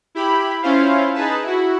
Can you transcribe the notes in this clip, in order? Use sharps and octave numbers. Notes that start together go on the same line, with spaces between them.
E4 G4 B5
C#4 E4 F4 C5 F5
D#4 G#4 B4 A5
E4 F#4